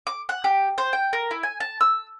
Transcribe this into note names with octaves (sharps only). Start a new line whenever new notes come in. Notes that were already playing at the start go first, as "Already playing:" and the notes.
D6
F#5
G4
C5
G5
A#4
E4
G#5
A5
E6